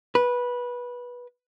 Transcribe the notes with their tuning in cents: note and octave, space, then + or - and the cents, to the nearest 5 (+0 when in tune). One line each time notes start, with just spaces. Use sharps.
B4 -15